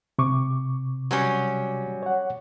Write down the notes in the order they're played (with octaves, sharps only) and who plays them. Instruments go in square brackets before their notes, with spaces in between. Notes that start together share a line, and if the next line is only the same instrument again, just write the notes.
[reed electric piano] C3 C#6 D6
[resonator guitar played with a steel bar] F#3 G3 C#4
[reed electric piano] C#5 F#5